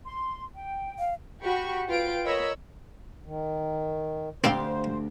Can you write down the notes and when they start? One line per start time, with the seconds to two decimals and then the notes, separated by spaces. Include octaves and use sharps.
0.04 C6
0.54 G5
0.99 F5
1.43 F#4 G4 B5 C#6
1.88 F4 B4 F5 G5 D7
2.25 A#4 C#5 D#5 B5 E6
3.26 D#3
4.44 D2 C4 G4 C5 F5